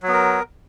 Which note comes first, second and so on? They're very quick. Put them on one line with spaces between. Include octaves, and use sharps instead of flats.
F#3 B3 A#4